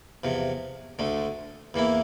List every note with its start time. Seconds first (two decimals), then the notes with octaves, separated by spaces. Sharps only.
0.24 E2 C3 F3
0.99 D2 D3 A3
1.74 E2 E3 A#3 E4